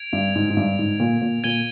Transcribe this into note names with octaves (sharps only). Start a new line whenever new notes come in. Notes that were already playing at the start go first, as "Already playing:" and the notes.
Already playing: G#6 D7 F7
G2
G#2
G#2
G2
G#2
A#2
A#2
A#2 G#6 D#7 G7